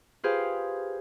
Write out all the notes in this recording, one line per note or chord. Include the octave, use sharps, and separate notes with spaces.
F4 G4 G#4 B4 C5 F5